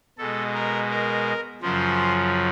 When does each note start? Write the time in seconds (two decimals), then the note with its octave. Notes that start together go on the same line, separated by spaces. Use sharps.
0.18 B2 G#3 A4
0.54 A#4
0.90 A#4
1.62 F#2 C#3 F3 C5